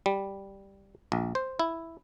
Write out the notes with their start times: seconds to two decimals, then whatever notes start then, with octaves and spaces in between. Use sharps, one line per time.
0.06 G3
1.12 A#1
1.35 C5
1.59 E4